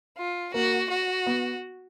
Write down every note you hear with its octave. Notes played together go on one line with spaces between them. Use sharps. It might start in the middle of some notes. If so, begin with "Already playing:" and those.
F4
A#3 F#4
F#4
B3